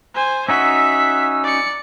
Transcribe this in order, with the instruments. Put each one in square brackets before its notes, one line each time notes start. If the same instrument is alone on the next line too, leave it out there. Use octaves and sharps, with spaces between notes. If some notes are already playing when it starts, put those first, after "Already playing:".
[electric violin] C5 G#5
[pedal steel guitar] C#4 D#4 F#4 [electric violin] E5 B6 [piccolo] E6
[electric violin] D5 C#7